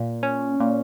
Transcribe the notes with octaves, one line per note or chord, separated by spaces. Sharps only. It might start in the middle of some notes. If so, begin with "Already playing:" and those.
Already playing: A#2
C#4
A#2